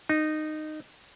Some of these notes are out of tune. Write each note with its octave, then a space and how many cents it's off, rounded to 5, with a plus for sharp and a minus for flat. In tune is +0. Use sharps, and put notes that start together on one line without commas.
D#4 -15